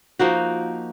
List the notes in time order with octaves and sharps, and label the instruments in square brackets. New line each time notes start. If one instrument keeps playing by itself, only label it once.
[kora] F3 A#3 D#4 F#4